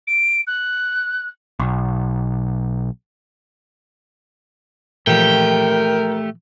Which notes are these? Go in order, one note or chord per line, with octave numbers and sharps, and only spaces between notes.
D7
F#6
B1
A#2 E3 F3 A3 G4 A#4 G5